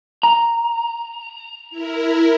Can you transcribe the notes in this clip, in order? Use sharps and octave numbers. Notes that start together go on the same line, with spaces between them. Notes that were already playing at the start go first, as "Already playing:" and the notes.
A#5
E4 A#4